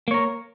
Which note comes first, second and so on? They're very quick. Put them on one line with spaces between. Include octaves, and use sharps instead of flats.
A#3 C#5 A#4